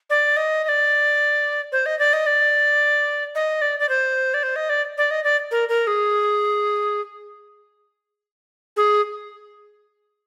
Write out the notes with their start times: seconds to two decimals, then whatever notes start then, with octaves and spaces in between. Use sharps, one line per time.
0.10 D5
0.37 D#5
0.64 D#5
0.69 D5
1.72 C5
1.86 D#5
1.99 D5
2.13 D#5
2.26 D5
3.35 D#5
3.62 D5
3.79 D5
3.89 C5
4.34 D5
4.43 C5
4.56 D#5
4.69 D5
4.98 D5
5.11 D#5
5.24 D5
5.51 A#4
5.69 A#4
5.87 G#4
8.77 G#4